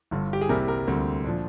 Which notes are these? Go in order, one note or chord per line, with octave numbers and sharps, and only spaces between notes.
G1 G2 D3
G4
G#4
C2 C3 G3 A#3 A#4
A#4
D2 D3 G3 A#3 C4
A#2 F3 D4